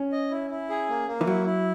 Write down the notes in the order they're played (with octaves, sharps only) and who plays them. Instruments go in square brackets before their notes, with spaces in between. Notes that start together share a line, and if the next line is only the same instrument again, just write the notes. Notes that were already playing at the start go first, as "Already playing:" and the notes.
Already playing: [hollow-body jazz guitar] C#4
[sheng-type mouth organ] D#5
E4
E4
G#4
A#3
A#3
[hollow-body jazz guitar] E3
[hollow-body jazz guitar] F#3 [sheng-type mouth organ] E4
[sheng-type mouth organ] E4